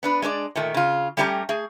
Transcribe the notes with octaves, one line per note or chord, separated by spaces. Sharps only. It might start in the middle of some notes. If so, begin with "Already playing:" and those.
B3 D4 B4
G#3 D4 C#5 D5
A#2 D#3 A3
C#3 F4
G3 A3 C#4 G4 E5 A#5
A3 G#4